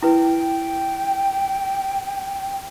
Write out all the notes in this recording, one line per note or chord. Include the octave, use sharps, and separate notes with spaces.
E4 B4 G5